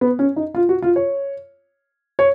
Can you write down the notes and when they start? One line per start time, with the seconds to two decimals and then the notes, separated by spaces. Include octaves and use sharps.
0.01 B3
0.19 C#4
0.36 D#4
0.55 F4
0.69 F#4
0.82 F4
0.96 C#5
2.19 C#5